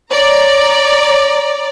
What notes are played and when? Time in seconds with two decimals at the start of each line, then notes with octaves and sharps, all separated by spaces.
0.11 C#5 D5 A#5